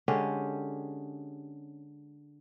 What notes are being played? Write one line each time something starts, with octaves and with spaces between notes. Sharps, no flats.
D3 G#3 C#4 G4